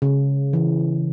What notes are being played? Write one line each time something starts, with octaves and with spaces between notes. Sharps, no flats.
C#3
E3